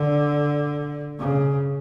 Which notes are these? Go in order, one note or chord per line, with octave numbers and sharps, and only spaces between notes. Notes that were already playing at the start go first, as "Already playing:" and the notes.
Already playing: D3
C#3